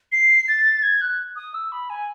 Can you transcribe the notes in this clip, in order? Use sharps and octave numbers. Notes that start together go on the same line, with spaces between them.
C7
A6
G#6
F#6
D#6
E6
B5
G#5